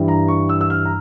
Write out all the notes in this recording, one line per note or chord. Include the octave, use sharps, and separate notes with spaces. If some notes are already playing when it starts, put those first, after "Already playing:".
Already playing: G2 E3 G3
A#5
C#6
E6
E6
F6
A#5